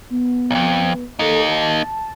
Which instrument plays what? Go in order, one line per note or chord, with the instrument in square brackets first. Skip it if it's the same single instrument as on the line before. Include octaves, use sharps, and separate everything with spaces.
[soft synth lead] B3
[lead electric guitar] B1 F2
[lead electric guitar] A#3 D#4 [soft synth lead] A4
[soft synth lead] A5